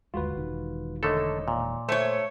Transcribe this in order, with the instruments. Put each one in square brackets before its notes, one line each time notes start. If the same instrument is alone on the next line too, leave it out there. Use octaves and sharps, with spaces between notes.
[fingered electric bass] G1 D#2 G#3 [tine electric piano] F4 F#4 B4
[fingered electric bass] E1 D#3
[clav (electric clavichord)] D3 A3 A4 [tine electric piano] A#4 C#5 D#5
[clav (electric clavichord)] A#2
[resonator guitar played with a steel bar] A3 C#5 [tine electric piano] C5